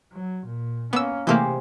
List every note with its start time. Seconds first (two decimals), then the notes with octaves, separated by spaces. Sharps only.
0.12 F#3
0.46 A#2
0.93 A#3 B3 C#4 E6
1.27 C3 E3 A3 A#3 G4 G#4 C5